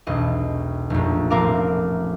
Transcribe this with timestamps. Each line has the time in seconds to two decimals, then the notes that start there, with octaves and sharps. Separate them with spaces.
0.07 E1 B1 D#5
0.90 F1 A#1
1.30 A1 F3 C4 A#4 F5 D6